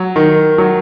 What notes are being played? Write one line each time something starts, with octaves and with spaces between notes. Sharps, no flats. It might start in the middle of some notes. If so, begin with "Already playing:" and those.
Already playing: F#3
D#3
F#3